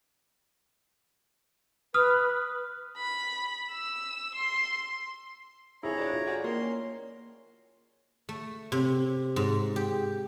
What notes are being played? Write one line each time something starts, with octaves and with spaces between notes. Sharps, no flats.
B4 D#6 F6
B5
E6
C6
F2 E4 G#4 C#5 A#5
D2 D4 D5
F4
F#4 G#4 D5
D#3 A#3 C6
C#4
A3
C3
G#2
G4